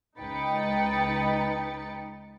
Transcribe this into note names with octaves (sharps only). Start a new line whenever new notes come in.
C#2 D#4 B4 G5 A6 C#7